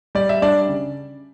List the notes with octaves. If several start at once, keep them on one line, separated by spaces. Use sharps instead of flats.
G3 D5
E5
G3 D4 D5
C#3